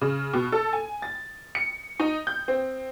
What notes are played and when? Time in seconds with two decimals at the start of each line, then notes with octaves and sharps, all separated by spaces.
0.01 C#3
0.34 B2
0.52 A4
0.73 G#5
1.02 A6
1.55 C#7
2.00 D#4
2.27 G6
2.48 C4